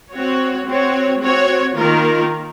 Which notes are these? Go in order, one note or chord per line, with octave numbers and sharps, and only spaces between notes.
C4 F#4 C#5
C4 F#4 C#5
C4 F#4 C#5
D#3 A#3 F4 A#4